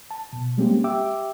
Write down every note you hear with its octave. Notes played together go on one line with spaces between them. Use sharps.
A5
B2
G3 G#3 A#3 C4 C#4 G4
G4 E5 G5 D6 E6